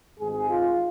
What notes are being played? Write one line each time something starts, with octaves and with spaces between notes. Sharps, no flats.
G#1 G#2 G#3 G#4
F4